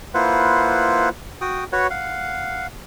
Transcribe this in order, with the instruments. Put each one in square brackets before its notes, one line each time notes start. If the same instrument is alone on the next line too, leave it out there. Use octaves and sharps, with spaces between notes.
[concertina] A#3 E4 F4 B4 C5 F#5
F#4 G5 D#6
F#4 B4 C#5 F#5
F5 F#5